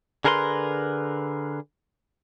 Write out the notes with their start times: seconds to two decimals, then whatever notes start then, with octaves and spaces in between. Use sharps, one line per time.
0.24 D3 G#4 A#4 B4 F#5 C6